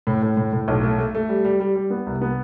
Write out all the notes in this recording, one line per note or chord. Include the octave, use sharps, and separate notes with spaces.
A2
A2
A2
A2
B1
A3
A3
A3
G3
G3
G3
G3
B3
C2
B3